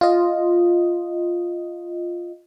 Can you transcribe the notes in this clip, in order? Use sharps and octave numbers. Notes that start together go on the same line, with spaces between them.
F4 D#5